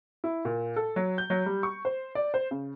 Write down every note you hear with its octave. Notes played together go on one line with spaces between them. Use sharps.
E4
A#2
A4
F#3
G6
F#3
G3
C#6
C5
D5
C5
C#3